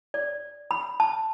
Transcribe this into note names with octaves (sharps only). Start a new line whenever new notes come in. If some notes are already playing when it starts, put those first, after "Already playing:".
D5
B5
A5